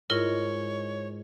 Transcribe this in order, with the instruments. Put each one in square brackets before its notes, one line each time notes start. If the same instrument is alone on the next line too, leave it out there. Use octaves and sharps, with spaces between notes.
[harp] G#2 [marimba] E4 F4 A#4 [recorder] C#5